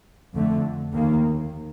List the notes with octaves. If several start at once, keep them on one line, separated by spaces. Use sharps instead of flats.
F2 D3 A3
D#2 D#3 A#3